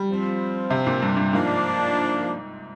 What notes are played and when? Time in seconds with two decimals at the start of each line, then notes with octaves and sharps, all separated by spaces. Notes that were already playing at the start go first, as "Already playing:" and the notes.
Already playing: G3
0.09 F3 C4 F4
0.70 C3
0.87 A#2
1.02 G2
1.17 G2
1.32 G#2 F3 A#3 D4